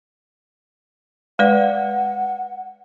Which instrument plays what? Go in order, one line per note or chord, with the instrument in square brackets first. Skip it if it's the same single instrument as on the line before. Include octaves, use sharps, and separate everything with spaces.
[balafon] G#3 B4 D5 [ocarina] F#5